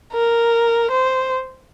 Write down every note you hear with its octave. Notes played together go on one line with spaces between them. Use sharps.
A#4
C5